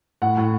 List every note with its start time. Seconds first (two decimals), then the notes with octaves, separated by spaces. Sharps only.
0.22 A2 F#5
0.37 A2